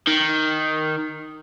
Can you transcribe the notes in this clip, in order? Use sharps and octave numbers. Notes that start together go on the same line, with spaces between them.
D#3